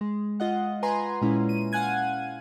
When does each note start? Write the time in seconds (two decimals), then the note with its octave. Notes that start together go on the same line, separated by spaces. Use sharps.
0.01 G#3
0.40 F4 D#5 F#5
0.83 B4 G#5 A#5 C6
1.22 A#2 G#3 C#4 E4
1.49 D#7
1.72 F5 F#5 G#5 F#6 G#6 D#7